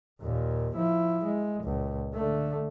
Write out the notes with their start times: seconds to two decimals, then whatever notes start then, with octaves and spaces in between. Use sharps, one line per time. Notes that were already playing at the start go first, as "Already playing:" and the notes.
0.22 D#2 A#2
0.76 F3 E4
1.25 G#3
1.64 C#2 A#2
2.14 D3 A3